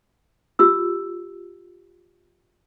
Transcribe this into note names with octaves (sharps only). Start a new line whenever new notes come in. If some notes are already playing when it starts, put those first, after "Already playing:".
F4 G4 E6